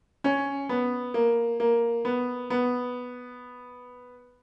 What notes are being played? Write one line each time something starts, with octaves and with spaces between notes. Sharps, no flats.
C#4
B3
A#3
A#3
B3
B3